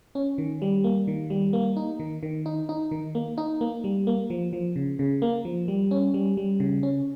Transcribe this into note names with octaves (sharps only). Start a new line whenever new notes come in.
C#4
D#3
G3
A#3
D#3
G3
A#3
D#4
D#3
D#3
D#4
D#4
D#3
A#3
D#4
A#3
G3
A#3
F3
F3
C#3
C#3
A#3
F3
G3
C#4
G3
G3
C#3
C#4